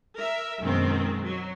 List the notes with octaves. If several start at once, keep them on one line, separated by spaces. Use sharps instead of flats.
A#4 E5
F#2 B2 D#3 G#3 C4
F#3